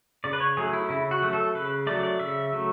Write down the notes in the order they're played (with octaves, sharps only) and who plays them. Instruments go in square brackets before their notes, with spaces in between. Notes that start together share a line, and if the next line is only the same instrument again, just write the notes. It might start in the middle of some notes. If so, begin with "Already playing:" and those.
[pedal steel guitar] C#3 D5
B4
C#5
F#3 A3 G#4
E4
C#3 E4
F#4
F#3 A3
A4
C#3 B4
F#3 A3 D5
D5
C#3 E5
F#3 A3